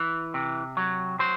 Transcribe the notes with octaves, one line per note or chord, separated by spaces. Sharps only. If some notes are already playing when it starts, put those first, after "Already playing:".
Already playing: E3
C3
F#3
F#3 C5